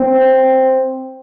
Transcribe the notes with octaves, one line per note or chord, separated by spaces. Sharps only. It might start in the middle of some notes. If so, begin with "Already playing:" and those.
Already playing: C4